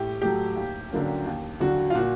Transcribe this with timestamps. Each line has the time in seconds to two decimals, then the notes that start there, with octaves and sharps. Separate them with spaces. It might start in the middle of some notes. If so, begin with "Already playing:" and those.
Already playing: A2 G4
0.22 F#3 A3 G4
0.56 D#2
0.91 D3 F#3 A#3 C#4
1.26 D#2
1.60 D3 F#3 F#4
1.90 F4
1.95 A#2 F#4